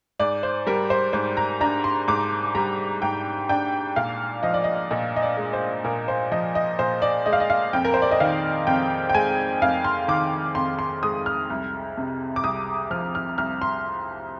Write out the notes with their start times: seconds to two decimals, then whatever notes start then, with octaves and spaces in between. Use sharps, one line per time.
0.20 G#2 D5
0.43 C5
0.67 G3 A#4
0.90 C5
1.13 G#2 C5
1.37 A#5
1.61 D4 A#5
1.84 C6
2.08 G#2 D6
2.55 G3 A#5
3.02 G#2 G5
3.49 D4 G5
3.96 A#2 F5
4.43 F3 D#5
4.54 D5
4.64 D#5
4.91 A#2 D#5
5.16 D#5
5.22 D5
5.37 G#3
5.53 C5
5.84 A#2 A#4
6.08 C5
6.32 F3 D#5
6.55 D#5
6.79 A#2 C5
7.02 D5
7.26 G#3 D#5
7.33 F5
7.40 D#5
7.50 F5
7.73 F2 G5
7.85 A#4
7.94 C5
8.02 D5
8.11 D#5
8.20 D#3 F5
8.67 F2 G5
9.09 G5
9.14 G#3 G#5
9.62 F2 F5
9.84 C6
10.08 D#3 D6
10.55 F2 C6
10.79 C6
11.03 G#3 D#6
11.26 F6
11.50 C2
11.97 C3
12.36 D6
12.44 C2 D#6
12.90 F3 F6
13.15 F6
13.38 C2 F6
13.62 C6